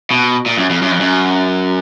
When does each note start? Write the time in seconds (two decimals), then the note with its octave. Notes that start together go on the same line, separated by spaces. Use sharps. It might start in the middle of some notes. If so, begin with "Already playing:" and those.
0.11 B2
0.46 A#2
0.58 F#2
0.70 F2
0.82 F#2
0.91 F2
1.00 F#2